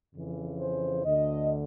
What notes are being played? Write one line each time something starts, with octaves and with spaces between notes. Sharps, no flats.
F2 C#3 E3
C5
D2 D3 D#5